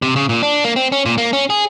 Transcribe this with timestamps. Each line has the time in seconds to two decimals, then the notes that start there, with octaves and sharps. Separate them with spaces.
0.02 C3
0.16 C#3
0.29 A#2
0.43 D4
0.64 A#3
0.76 C4
0.92 C#4
1.06 A#2
1.18 A#3
1.33 C#4
1.50 G#4